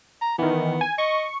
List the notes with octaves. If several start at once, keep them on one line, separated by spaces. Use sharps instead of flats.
A#5
D#3 E3 B3
G#5
D#5 C#6